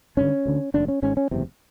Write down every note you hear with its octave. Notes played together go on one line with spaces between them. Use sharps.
G#1 G2 D3 C#4
D2 D3
F1 D#2 D3 D4
C#4
G#1 G#2 C#4
C#4
F#1 E2 C3